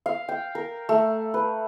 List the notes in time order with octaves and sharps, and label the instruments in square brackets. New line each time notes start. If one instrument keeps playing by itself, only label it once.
[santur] F5
G5
A#4
A3
B4